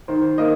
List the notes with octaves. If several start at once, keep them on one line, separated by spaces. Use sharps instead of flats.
D#3 C5
A#3 D#5